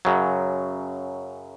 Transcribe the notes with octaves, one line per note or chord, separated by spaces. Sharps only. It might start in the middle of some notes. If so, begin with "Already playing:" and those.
F#2 C#3 F#3